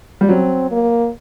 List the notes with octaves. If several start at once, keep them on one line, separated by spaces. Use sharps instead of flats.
G3
F#3 C4
A#3